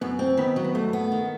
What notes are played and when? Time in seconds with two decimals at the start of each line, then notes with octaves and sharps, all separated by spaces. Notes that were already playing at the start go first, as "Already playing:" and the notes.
0.01 F#2 B3
0.19 C4
0.37 D#3 B3
0.56 F#3
0.64 B3
0.75 G2 A3
0.93 B3
1.12 D#3